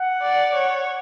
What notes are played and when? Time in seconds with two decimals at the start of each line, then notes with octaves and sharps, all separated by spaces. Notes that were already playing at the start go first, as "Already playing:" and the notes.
Already playing: F#5
0.22 D5
0.54 C#5